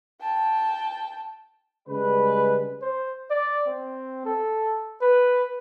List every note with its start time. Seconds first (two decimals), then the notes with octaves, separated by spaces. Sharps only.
0.22 G5 A5
1.88 C#3 G3 G#3 B4
2.82 C5
3.30 D5
3.67 C4
4.25 A4
5.01 B4